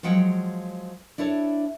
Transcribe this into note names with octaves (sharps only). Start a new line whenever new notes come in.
F3 F#3 G#3 F#5 G5
D4 E4 A4 C#5